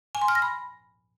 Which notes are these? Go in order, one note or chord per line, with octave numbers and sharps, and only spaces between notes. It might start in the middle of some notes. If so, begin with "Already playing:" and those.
G#5
C6
F6
A#6
B5